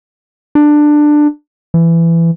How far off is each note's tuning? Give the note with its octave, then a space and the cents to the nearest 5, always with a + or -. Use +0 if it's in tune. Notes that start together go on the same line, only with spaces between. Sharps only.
D4 +15
E3 +20